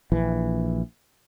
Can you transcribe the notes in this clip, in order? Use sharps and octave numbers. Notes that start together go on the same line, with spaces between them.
A#1 E3